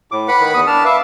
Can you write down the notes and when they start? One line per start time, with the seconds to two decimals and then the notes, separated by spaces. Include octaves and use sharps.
0.12 A2 D6
0.28 B4 F#5 B5
0.40 D#3
0.54 E2 D#6
0.67 D4 A5 F6
0.85 B4 E5 F5 D6